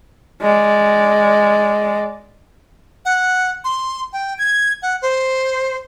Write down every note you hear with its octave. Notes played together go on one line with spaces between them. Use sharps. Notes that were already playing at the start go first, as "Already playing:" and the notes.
G#3 D5
F#5
C6
G5
G#6
F#5
C5